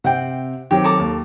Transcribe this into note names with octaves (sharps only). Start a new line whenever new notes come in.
C3 C4 F#5 G5
D#3 F#3 C4 G4
A4 A#5 D6
D#2